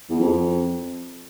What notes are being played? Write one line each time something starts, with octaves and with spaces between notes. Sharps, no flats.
E2
F2